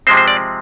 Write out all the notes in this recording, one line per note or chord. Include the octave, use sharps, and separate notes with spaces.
C3 F3 G#3 C4 C5
C5
D5